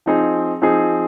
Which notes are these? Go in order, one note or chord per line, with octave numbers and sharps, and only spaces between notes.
F3 C4 D#4 G#4
F3 C4 D#4 G#4